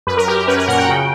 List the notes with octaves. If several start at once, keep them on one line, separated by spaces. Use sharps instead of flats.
F#2 B4
A#4
F#2 G4
A#4
C#4 B4
A#4
A#2 F#5
G5
C#3